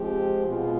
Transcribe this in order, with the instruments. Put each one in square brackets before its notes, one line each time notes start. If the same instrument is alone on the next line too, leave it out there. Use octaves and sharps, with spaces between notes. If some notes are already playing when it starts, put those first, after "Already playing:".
Already playing: [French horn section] F3 G#3 C4 G4
B2 G#3 B3 F4